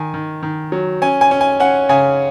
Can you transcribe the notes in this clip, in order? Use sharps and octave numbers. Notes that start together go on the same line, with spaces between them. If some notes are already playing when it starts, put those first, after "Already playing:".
Already playing: D#3 G#5
D#3
D#3
F#3
C#4 G#5
G#5
C#4
G#5
C#4 F#5
C#3 G#5